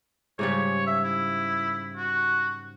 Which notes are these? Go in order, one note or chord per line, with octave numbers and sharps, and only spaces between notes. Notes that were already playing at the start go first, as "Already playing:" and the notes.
G#2 C#3 G3 C#5
E5
E4
F#4